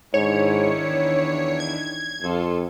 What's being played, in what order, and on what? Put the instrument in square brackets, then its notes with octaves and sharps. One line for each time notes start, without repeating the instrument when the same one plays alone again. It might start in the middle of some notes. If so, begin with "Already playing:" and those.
[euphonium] G#2 [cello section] D#3 D4 E4 [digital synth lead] C#5
[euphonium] E2
[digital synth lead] G#6
[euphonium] F2 [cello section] F4 A4